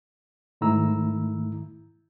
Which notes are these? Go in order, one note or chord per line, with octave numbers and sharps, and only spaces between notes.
G#2 D#3 A3 E4 A#5 E6